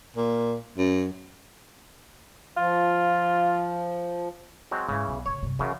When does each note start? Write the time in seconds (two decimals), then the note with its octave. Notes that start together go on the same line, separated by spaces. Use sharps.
0.16 A#2
0.78 F#2
2.57 F3 F4
4.71 F#3 G#3 C4
4.89 G#2 C#3 E3
5.08 B1
5.26 A2 C#3 C#5
5.42 G2 C3
5.59 F#2 C#3 E3